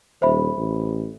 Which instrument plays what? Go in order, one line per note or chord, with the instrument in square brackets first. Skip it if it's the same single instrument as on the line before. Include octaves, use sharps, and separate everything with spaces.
[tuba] D#1 [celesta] C5 E5 B5
[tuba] A1